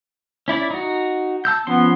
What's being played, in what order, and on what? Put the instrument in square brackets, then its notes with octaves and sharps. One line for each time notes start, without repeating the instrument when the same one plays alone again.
[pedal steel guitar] C#4 E4 D5
D#4 F#4
A5 E6 G6
[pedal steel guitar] F3 C#4 C6 [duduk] B3